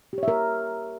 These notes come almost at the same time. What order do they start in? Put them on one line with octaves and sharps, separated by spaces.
G4 C#5 E5 A#4